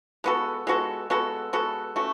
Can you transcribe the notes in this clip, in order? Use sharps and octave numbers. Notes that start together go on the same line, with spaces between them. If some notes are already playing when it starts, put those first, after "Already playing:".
G#3 B3 F#4 A4
G#3 B3 F#4 A4
G#3 B3 F#4 A4
G#3 B3 F#4 A4
A3 C#4 F#4